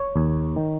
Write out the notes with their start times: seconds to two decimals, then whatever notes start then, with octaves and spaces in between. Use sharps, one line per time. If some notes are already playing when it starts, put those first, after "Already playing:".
Already playing: C#5
0.16 D#2
0.56 D#3